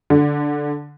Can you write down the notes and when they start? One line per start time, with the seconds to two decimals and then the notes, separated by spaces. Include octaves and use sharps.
0.10 D3